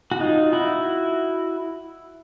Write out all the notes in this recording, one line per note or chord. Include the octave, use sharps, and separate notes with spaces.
F#4
D#4 F4
E4 F#4